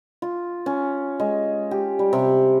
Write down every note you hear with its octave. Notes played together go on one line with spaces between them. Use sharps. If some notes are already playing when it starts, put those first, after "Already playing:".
F4
C#4
G#3
G4
G3
C3